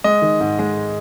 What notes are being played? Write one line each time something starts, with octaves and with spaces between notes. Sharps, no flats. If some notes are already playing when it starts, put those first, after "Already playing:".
G#3 D#5
D#3
G#2
G#3